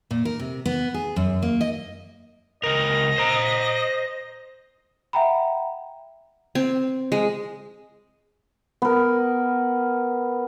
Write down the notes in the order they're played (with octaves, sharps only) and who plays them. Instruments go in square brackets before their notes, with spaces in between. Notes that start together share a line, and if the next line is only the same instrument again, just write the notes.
[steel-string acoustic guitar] A#2
A#4
C3
B3
G#4
F#2
A#3
D#5
[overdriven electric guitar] C#2 A#4 [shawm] D#5
[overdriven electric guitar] C5 A#5
[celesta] E5 F#5 G5 A#5 B5
[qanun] C4
G#3
[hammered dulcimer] B3 A#4